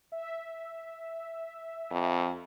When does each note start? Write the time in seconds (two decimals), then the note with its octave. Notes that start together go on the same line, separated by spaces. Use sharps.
0.12 E5
1.91 F2